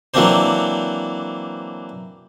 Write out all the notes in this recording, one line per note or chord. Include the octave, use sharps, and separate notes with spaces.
E3 F#3 A#3 C4 D4 C5